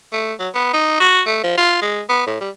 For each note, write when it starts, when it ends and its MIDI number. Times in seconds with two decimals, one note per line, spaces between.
0.13 0.34 57
0.39 0.49 54
0.55 0.69 59
0.74 0.99 63
1.00 1.22 66
1.27 1.41 57
1.44 1.53 53
1.58 1.77 65
1.82 2.02 56
2.09 2.24 59
2.27 2.36 45
2.41 2.50 55